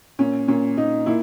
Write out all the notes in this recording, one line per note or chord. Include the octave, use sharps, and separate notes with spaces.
A#2 C#4
A#2 C#4
A#2 D#4
A#2 E4